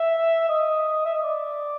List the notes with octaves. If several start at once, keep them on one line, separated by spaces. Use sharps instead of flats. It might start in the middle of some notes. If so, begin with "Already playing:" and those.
Already playing: E5
D#5
E5
D#5
D5